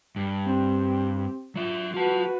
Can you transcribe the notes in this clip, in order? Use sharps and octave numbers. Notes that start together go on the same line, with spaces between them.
G2
C4 G4
F#3 F4 E5
F4 F#4 B4 A5